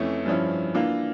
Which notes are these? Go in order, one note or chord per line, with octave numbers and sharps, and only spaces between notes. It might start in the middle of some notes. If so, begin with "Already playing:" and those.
Already playing: F2 E3 A3 C#4
G2 F3 C#4 E4
E3 A#3 D4 F4